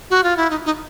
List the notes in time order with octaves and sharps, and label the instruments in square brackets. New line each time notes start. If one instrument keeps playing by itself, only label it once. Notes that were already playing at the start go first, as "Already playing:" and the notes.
[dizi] F#4
F4
E4
D#4
D#4